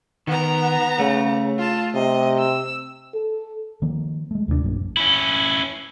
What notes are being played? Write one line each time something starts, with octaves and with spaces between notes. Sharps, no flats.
D#3 B3 A#5
C#3 A3
F4 A5
C3 D#5
E6
A4
D#3 F3 A#3
G#3 A3
D#2 C3 A#3 D4
A#1 F#2 A#3
C#4 E4